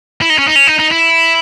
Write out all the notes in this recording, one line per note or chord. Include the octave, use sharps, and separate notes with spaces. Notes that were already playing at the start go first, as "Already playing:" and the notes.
E4
D#4
C#4
D#4
C#4
D#4
D#4
E4